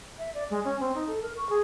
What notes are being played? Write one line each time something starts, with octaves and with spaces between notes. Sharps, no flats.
E5
D5
G#3
C#4
C4
D#4
A4
A#4
C#6
G#4